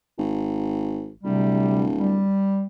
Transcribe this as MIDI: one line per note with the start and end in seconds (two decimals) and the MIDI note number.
0.18 1.12 32
1.24 2.26 26
1.24 1.86 48
1.24 1.86 55
1.99 2.64 55